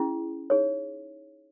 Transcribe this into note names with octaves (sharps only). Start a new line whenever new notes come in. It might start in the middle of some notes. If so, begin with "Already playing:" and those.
Already playing: C#4 E4 G#4
D#4 G#4 C#5